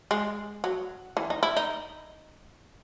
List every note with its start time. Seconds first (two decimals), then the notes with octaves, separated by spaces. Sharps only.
0.11 G#3
0.64 F#3
1.17 E3
1.30 D#4
1.43 E4
1.57 D#4